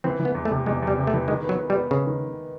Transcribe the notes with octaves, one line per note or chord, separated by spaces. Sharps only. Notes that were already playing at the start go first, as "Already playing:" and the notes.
E3 C4
E3
B3
E2
A3
C3
E2 G#3
E2 G3
C3
A3
E3
D#3 G#3
F#3 B3
B3
G3
B3
C#3 B3
D#3